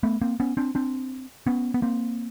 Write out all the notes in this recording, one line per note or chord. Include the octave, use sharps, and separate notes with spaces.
A3 B3
A#3 C4
B3 C#4
C4 D4
C4 D4
B3 C#4
B3
A#3 C4